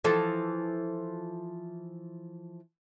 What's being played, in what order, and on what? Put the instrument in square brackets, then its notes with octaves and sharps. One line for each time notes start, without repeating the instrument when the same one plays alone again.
[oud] E3 F3 A4